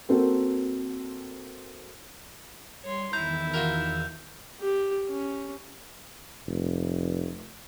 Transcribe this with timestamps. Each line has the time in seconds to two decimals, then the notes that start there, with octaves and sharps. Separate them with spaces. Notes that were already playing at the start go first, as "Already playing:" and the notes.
0.09 A#3 C4 F#4 A4 C5
2.83 G3 C#5 C6
3.13 E2 D#3 E4 A#5 E6 G6
3.54 F4 F#4 A#4
4.61 G4
5.08 C#4
6.47 F1